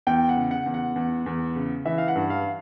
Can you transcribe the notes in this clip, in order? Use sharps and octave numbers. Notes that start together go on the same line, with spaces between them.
E2 G5
F#5
C#3
F#5
E2
F#5
E2
E2
C#3
E3 E5
F5
F#5
G2
F5